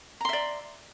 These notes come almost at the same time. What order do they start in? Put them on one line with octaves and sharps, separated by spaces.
A#5 C6 E5 D5